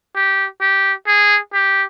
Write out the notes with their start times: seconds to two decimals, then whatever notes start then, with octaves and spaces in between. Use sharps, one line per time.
0.15 G4
0.61 G4
1.07 G#4
1.53 G4